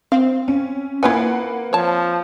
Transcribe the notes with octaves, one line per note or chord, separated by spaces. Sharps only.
C4 F5
C#4
A#3 E4 F4 B4 F#5 G#5
F3 C#5 A5